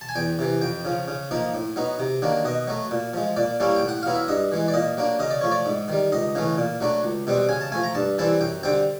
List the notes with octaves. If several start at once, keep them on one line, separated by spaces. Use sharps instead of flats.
A5
G#5
E2 G5
C3 E3
F2 G5
C#3 F3
C#3
F3 A#3 D#4
A2
F#3 B3 D#4
C3
D#3 F#3 A#3 D4
B2 D#5
F#3 A3
A#2
F3 G#3
A#2 D5
G3 A#3 C#4 E4
G5
A2
F#5
F#3 B3 E4 F5
E5
G2 D#5
E3 G#3
D5
A#2 D#5
F#3 A#3 D4
C#3 D#5
D5
F3 A3 C#5
D5
G#2
D#3 G3
C#2 D#5
C#3 E3 A3
A#2
F#3 A3 D4
C#2
B2 G3 C4
C#3 G#5
A5
F3 A3 G#5
A#5
G2 A5
E3 G3 C4 E4 A5
F#2 G5
D3 G3 C4 G5